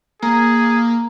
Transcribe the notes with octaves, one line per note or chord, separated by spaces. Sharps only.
A#3 G#4 A#5